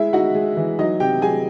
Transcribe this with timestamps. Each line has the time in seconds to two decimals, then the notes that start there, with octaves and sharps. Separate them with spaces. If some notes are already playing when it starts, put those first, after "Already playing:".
Already playing: G#3 E4 E5
0.13 D#4 F#4 F#5
0.35 G#3
0.57 E3
0.79 F#3 D#4 D#5
1.00 C3 G4 G5
1.22 F#3 G#4 G#5